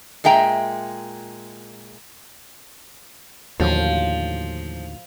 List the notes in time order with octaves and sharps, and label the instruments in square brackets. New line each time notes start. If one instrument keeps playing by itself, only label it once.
[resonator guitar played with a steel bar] A#2 G#3 E5 G5 A#5
[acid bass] D#2 [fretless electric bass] A2 D3 F#3 [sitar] F3